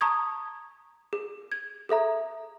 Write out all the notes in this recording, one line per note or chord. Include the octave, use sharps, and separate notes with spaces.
A5 A#5 C#6 D#6 G#6
G#4
G#6
G#4 A4 E5 A#5